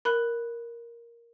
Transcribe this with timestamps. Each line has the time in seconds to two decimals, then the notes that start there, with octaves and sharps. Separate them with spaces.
0.05 A#4 B5 F#6